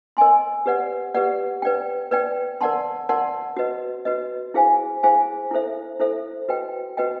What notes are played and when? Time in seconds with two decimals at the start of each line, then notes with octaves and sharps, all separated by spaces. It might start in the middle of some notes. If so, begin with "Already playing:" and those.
0.17 A#4 D#5 G#5 C6
0.66 G4 B4 D5 F#5
1.14 G4 B4 D5 F#5
1.62 B4 D5 G5
2.11 B4 D5 G5
2.61 A#4 D5 F#5 A5 C6
3.09 A#4 D5 F#5 A5 C6
3.57 F#4 B4 D#5
4.05 F#4 B4 D#5
4.54 E4 G#4 C5 F5 G#5
5.03 E4 G#4 C5 F5 G#5
5.51 E4 A4 C5 E5
5.99 E4 A4 C5 E5
6.49 F#4 B4 D#5 G5
6.97 F#4 B4 D#5 G5